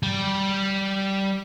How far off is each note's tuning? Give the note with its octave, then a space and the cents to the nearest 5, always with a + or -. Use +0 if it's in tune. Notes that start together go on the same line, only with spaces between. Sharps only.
G3 -10